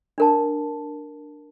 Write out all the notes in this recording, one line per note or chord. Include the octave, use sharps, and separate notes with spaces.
D4 A#4 A5